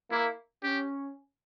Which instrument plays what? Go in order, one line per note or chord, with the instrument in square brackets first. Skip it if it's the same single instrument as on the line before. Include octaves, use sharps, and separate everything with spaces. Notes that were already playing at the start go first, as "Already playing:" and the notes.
[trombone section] A#3 [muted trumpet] E4
[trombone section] C#4 [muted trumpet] G4